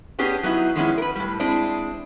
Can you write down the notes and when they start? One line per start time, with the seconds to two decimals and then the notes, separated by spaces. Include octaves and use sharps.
0.19 B3 C#4 D4 G4 G#4
0.43 F#3 B3 D#4 E4
0.76 D#3 F3 G#3 B3 C#4 E4
0.98 A#4 B4
1.16 A2 G3
1.40 G#3 C4 D4 E4